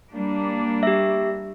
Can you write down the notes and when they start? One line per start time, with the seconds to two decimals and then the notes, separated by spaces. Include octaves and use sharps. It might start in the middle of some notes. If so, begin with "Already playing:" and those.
0.13 G3 A#3 D4
0.83 G4 E5